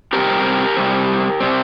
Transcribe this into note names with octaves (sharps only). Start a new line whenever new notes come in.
C3 G3 C4 G4 A#4
C3 G3 C4
C3 G3 C4